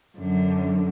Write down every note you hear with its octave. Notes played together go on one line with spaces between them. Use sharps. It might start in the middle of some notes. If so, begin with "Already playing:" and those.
F#2 D3